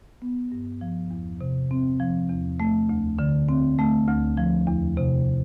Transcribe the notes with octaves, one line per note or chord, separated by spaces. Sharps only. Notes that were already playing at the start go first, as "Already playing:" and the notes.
B3
G2
F3
E2
C3
C4
F3
E2
A3
D2
D3
C4
A3
D2
F3
E2
C3